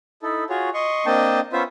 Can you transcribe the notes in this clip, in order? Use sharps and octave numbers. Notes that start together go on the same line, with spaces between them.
D#4 E4 A4
F4 F#4 G#4 C#5
D#5 C6 C#6
A#3 C4 D4 D#5 G5 A5
B3 C#4 F4 C5 E5